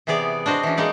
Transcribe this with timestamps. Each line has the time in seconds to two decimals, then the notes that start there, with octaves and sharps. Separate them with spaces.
0.07 C3 E3 B3 G#4 D5
0.46 D4 F#4 C5 D#5
0.63 E3 C#4
0.77 G#3 A#3 D#4 D5